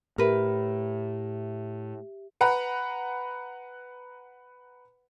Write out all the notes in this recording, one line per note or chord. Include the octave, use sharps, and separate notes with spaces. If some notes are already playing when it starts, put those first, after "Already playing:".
A2 G4 A#4 B4 E5
B4 F#5 A#5 B5